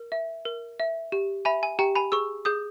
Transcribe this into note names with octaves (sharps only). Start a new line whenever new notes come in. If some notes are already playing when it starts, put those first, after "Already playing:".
Already playing: A#4
E5
A#4
E5
G4
E5 G#5 B5
G#5
G4 G5 A#5
G#5 B5
G#4 C#6 E6
G#4 D#6 G6